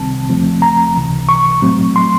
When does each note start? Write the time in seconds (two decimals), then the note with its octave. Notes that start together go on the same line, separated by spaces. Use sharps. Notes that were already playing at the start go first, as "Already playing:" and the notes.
Already playing: C2 C3 D#3 G3 C4 A5
0.29 E2 C#3 F3 A3 C4
0.62 A#5
0.96 C#2 C3 E3
1.29 C#6
1.62 A2 F#3 A3 C4
1.96 C6